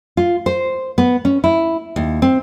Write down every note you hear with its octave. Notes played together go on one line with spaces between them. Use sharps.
F4
C5
B3
C#4
E4
D#2
C4